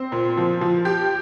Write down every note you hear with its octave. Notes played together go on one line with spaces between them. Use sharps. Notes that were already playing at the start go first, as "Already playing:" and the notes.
Already playing: C4
A#2
F3
F3
G4